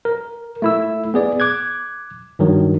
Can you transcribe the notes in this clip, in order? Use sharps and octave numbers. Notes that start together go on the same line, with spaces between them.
A#4
A3 E4 E6
B3 G#4 D5
D6 F#6 G#6
G2 D#3 F#3